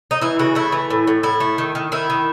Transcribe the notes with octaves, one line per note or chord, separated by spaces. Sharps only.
D#4
E3 E4
C#3 F#4
A3 E4
E3
A2
A2
A2 E4
A3
D#3
D#3
D#3 E4
D#3